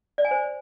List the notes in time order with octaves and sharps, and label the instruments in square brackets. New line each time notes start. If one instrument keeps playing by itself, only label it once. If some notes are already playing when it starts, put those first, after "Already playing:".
[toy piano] D5
G#5
C5